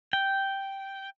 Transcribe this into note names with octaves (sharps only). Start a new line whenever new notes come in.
G5